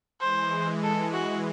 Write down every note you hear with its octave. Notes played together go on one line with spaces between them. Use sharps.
E3 G#3 C5
A4
F#4